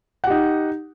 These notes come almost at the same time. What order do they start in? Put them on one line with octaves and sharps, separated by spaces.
F#5 G4 D#4